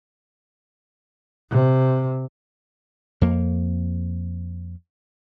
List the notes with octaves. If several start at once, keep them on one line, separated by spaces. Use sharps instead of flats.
C3
F2 A#3